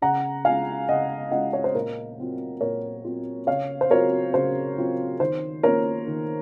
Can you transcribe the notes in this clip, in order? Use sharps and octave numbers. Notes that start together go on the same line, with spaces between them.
C#3 F#5 A#5
G#3 C#4 F4 F5 G#5
C#3 D#5 F#5
G#3 C#4 F4 D#5 F#5
C#5
C5
A#2 A#4
F#3 C4 F4
A#2 A#4 C#5
F#3 C4 F4
C#3 C#5 F5
C5
F#3 C4 F4 A#4 C#5
C#3 C5
F#3 C4 F4
D#3 C5
A#3 C#4 F4 A#4 C#5
D#3